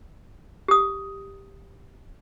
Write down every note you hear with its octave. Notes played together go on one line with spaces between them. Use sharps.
G4 D#6